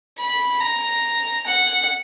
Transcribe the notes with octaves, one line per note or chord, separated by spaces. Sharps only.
B5
A#5
F#5